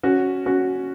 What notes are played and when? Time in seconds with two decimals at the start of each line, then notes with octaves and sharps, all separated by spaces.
0.03 C#4 F#4
0.46 C#4 F#4